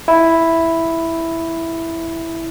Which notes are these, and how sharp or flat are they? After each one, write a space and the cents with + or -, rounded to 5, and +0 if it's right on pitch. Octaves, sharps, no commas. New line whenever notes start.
E4 +0